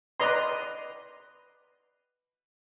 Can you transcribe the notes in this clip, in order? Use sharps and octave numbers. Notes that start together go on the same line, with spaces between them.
B4 D5 D#5 A#5 C6